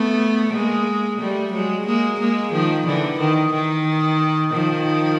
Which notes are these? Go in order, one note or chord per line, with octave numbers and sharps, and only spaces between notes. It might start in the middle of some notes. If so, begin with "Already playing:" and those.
Already playing: A3 B3
G#3 A#3
G3 A3
F#3 G#3
G#3 A#3
G#3 A#3
D#3 F3
D3 E3
D#3
D#3
D#3 F3